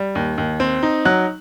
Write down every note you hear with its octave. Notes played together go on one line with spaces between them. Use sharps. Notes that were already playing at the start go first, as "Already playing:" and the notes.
Already playing: G3
D#2
D#2
C4
D#4
F#3 F#6